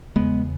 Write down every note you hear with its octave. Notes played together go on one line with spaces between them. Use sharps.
E2 C#3 G#3 B3